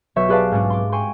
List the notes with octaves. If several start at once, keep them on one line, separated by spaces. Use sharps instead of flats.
B1 C#5 E5 C#6 G6
G4 G#4 B4 D5 F5 A5
G#2 C#4 D4
C6 D6
G5 G#5 C6 C#6